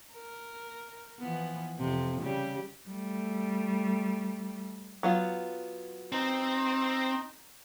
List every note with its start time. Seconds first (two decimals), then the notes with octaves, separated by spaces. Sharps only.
0.14 A#4
1.19 E3 F3 B3
1.79 F2 C3
2.21 C#3 G3 G4
2.89 G3 A3
5.03 F#3 B3 F4
6.12 C4 D#4